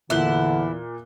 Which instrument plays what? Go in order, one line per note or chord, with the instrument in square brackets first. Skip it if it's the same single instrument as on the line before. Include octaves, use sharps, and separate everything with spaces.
[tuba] E2 [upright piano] A#2 F#6 G7 [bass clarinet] D3 [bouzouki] E4